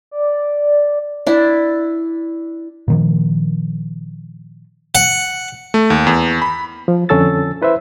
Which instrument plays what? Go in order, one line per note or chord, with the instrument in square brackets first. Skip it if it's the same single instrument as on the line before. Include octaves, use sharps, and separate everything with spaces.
[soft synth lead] D5
[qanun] D4 E4
[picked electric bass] A#2 D#3 F3
[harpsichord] F#5
[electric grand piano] A3
D#2
E2
B5
[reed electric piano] F3
F2 D3 C#4 A4 E6 A6
E4 B4 C5 E5